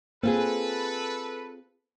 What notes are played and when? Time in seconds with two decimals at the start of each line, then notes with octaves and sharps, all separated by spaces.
0.24 A#3 C4 F4 G#4 A4 B4